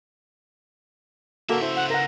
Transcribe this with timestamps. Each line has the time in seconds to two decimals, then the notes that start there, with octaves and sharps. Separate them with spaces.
1.49 C#3 A#3 F#4 A4 E5
1.62 E4 C5
1.76 F#5
1.90 A#4 F#5 A#6